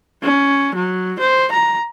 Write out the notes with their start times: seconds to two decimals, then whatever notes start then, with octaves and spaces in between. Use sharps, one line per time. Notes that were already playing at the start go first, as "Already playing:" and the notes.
0.23 C#4
0.75 F#3
1.19 C5
1.52 A#5